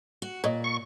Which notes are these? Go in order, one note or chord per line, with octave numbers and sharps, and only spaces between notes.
F#4
A#2 C#5 D#5
C#6